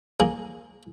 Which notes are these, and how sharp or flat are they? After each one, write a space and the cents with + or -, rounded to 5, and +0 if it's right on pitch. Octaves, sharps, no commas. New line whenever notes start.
A#3 +0 G#4 +5